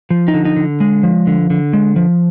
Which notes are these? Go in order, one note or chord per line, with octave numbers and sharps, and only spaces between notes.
F3
D#4
D3
D#4
D3
G#3
F3
D3
D3
G#3
F3